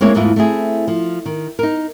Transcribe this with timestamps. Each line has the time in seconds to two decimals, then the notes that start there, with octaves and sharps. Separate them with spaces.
0.01 G#3 A#3 C4 E4 C#5
0.15 E2 G#2 E3 A3 E4 F4
0.36 A3 C4 E4 G#4
0.88 F3
1.26 D#3
1.59 D#4 A#4